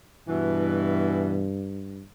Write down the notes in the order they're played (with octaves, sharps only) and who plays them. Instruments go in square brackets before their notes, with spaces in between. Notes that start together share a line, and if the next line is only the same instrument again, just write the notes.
[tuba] G2 [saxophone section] B2 E3